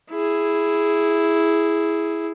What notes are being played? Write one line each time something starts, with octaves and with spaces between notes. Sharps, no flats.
E4 G#4